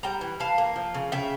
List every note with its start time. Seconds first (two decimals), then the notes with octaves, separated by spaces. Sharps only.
0.03 G3 G5 A#5
0.21 E3
0.40 E3 F5 A5
0.58 A#3
0.76 F3
0.94 C#3
1.12 C#3 E5 G5